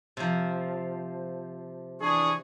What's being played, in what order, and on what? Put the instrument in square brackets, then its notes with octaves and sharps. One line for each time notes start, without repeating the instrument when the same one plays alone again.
[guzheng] C3 F3
[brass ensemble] E3 D4 G#4 [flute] C#6